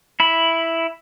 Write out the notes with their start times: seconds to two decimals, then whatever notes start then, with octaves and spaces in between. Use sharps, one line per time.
0.20 E4 B5